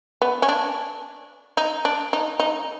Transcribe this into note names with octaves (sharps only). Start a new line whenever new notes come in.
B3
C#4
D4
D#4
D4
D#4
D#4